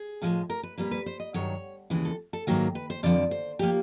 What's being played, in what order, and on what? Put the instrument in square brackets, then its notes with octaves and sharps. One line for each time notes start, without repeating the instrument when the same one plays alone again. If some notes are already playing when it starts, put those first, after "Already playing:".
Already playing: [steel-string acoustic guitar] G#4
A2 F3 G#3
A#4
B4
A#2 G3 A#3 B4
B4
C5
D#5
G2 D#3 F#3 C#5
D#2 C#3 E3 G#3
A4
A4
G#2 D#3 F#3 A#3 A#4
B4
C5
F2 D3 F3 D5
C5
F3 A#3 G4